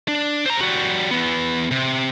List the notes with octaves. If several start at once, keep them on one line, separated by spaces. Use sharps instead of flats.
D4
C5 A#5
G3 F#4
E3 B3
C3